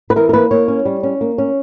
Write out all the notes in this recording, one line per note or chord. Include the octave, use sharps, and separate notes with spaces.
B4
E3 A#4
A#4
A#3 B4
A#3 C#5
C#4
G3
C#4
A#3
C#4